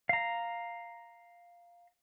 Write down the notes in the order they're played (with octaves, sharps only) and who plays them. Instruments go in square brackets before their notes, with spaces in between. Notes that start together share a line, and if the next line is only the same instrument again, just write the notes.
[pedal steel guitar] F5 A#5